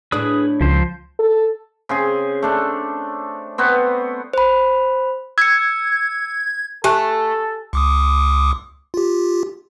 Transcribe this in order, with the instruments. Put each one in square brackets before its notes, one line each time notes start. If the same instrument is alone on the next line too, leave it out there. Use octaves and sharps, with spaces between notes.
[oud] A2 D4 [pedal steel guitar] G#4 B4 D#6
[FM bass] C#2 [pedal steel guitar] F3 C5
[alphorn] A4
[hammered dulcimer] C#3 C4 G#4
A3 D4 A4
B3 C4 F#4 B4
[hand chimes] C5 B5
[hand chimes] E6 C#7 [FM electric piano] G#6
[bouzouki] A3 [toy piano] G4 [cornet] A4 [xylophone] G#5 A5 F#6
[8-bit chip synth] C#2 D6 D#6
F4 G4